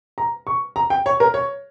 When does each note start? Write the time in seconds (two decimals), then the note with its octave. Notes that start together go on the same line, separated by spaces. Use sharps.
0.18 A#5
0.47 C#6
0.76 A#5
0.90 G5
1.06 C#5
1.20 A#4
1.34 C#5